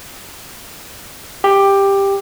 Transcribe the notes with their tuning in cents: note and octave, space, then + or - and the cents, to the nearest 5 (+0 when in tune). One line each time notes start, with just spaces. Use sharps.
G4 +10